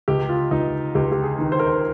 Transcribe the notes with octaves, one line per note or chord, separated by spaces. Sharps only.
C#2 G4
F4
C#2 D#4
C#2 G4
G4
G#4
D#3
C5
A#4
C5